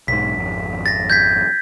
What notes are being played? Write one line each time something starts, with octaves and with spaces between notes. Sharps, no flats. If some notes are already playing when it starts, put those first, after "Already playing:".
B1 G#2 B6
G#1 F2
A6 A#6
G6 G#6 B6